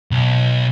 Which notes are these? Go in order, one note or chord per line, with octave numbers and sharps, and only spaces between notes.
B1